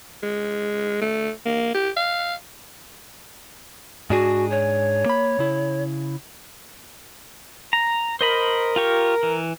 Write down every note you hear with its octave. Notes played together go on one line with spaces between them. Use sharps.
G#3
A3
A#3
G4
F5
G#2 D4 F#4 G#4
C#5
A#3 B5
C#3 E4
A#5
A#4 C5 D#5 B5
F4 G4 C#6
E3